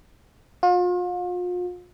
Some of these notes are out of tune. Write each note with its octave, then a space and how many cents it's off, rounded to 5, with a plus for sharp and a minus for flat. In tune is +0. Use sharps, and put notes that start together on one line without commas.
F4 +40